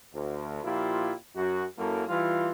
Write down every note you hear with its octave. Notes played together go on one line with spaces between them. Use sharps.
D2
A#2 F3 E4 F4 G4
F#2 F#4
F#2 F#3 A#3 E4 A4
E3 G3 F4